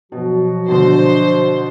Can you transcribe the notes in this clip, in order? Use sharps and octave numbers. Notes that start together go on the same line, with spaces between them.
B2 F3 F#3 F#4
B2 D3 C5